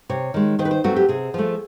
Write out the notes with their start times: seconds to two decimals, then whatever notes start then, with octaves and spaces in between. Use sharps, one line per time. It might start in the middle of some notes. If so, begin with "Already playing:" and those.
0.09 C3 C#5
0.34 D#3 G#3
0.59 D#3 C5
0.65 B4
0.71 C5
0.84 F#3 A3 C4 F#4
0.96 G4
1.08 C3 G#4
1.34 F3 A3